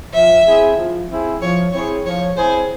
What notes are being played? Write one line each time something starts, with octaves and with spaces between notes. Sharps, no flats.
F3 E5
C4 E4 G#4
F3
C4 E4 G#4
F3 C#5
C4 E4 G#4 C#5
F3 C#5
C4 E4 G#4 C5